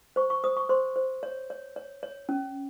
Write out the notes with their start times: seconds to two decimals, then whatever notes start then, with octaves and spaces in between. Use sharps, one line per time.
0.16 C5 C#6
0.30 C#6
0.44 C5 D#6
0.57 C#6
0.69 C5 C6
0.96 C5
1.23 C#5
1.50 C#5
1.76 C#5
2.03 C#5
2.29 C#4